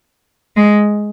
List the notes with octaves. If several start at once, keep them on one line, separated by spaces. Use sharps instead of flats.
G#3